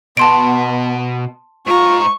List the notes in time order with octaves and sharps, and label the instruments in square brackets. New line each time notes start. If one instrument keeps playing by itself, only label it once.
[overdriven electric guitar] B2 [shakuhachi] B3 [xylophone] A5 C6 D7
[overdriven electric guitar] G#2 A#5 [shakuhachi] F4 [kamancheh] C#6